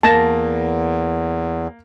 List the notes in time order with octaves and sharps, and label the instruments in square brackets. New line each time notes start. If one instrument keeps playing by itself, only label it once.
[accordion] E2 [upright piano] A#3 A#6 [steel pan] A5